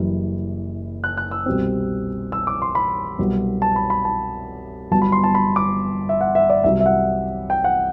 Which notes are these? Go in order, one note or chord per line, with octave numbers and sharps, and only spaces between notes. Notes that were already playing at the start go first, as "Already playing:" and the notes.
Already playing: F#1 F#2 E3 G3
F#6
F#6
E6
C2 B2 G3 C4
E6
D6
C6
B5
C2 B2 F#3 B3
A5
B5
B5
A5
G1 G2 F#3 B3 A5
B5
C6
A5
B5
D6
E5
F#5
E5
D5
C2 C3 F#3 E5
E5
F#5
G5
F#5